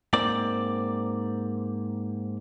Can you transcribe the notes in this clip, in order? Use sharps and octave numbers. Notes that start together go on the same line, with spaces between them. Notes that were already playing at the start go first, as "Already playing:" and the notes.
G#2 A#3 C4 D5